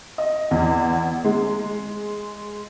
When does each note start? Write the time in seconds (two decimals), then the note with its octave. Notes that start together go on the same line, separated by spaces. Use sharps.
0.18 D#5
0.51 E2
1.25 G#3